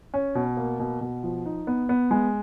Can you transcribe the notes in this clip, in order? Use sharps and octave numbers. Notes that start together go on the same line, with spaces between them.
C#4
B2
A#3
B2
B2
F3
D#4
B3
B3
G#3